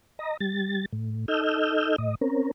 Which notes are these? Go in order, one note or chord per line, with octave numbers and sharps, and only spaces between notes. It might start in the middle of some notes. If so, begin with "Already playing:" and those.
D#5 A#5
G3 A6
A2
D#4 A4 D#5 E6 F6 G6
A2 D#5
C4 C#4 A#4